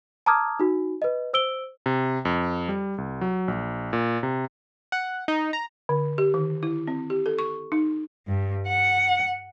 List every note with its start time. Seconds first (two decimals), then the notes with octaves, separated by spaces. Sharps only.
0.26 A5 A#5 D6 D#6 F6 G#6
0.60 D#4 F#4
1.02 B4 D#5
1.33 C5 E6 D7 G7
1.86 C3
2.25 F2
2.69 G3
2.98 C2
3.21 F#3
3.48 A#1
3.93 A#2
4.23 C3
4.92 F#5
5.28 D#4
5.53 A#5
5.89 D3
6.18 G4
6.34 D#3
6.63 E4
6.87 C4
7.10 G4
7.26 A4
7.39 C#6
7.72 D#4
8.27 G2
8.68 F#5